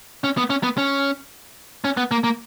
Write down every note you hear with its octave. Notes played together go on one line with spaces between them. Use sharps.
C#4
B3
C#4
B3
C#4
C#4
B3
A#3
A#3